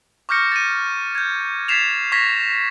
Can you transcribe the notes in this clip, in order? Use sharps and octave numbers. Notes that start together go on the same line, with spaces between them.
C#6 D6 F6 G6 A#6 C#7
A6 D#7
G6 G#6
G#6 A6 B6 C7 E7 F7
C#6 G#6 A#6 B6